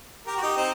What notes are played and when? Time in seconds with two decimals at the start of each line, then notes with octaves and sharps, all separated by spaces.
0.27 G4 A#4
0.37 F#4
0.42 D#4 G4
0.57 C4 D#4